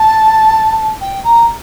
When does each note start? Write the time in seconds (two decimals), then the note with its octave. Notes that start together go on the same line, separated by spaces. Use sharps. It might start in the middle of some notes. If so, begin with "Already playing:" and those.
Already playing: A5
1.01 G5
1.24 A#5